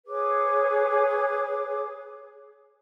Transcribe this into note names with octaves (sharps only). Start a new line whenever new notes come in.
G#4 B4 C#5 D6